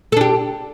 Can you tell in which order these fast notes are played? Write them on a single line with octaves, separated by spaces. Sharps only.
A4 D4 G4